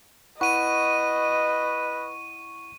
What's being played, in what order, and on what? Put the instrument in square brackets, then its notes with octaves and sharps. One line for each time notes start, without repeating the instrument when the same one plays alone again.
[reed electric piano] E4 F#5 [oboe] B4 [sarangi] D#5 [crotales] C#6 D#7